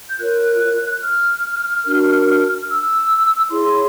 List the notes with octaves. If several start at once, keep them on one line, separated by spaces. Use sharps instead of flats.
G6
F4 A#4 C#5 F#6
F6
D4 F#4 A#4
F6
E6
E4 G#4 C#5 C6